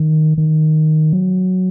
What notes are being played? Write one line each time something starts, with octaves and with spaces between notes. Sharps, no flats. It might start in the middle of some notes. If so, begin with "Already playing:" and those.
Already playing: D#3
D#3
F#3